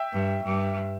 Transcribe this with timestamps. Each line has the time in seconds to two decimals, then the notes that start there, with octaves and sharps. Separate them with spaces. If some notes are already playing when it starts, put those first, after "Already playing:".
Already playing: E5 G5
0.13 G2
0.44 G2